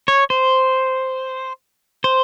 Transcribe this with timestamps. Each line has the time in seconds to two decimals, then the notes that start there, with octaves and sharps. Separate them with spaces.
0.08 C#5
0.30 C5
2.04 C5